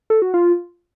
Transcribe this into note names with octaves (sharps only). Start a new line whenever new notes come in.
A4
F#4
F4